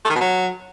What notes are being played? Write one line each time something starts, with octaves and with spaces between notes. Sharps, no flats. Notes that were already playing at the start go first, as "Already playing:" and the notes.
A3
D#3
B2
F#3